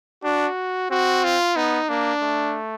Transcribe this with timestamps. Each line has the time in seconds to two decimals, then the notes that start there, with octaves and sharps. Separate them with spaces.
0.24 D4 F#4
0.91 C4 F#4
1.24 F4
1.56 B3 D#4
1.89 A#3 D4
2.22 A3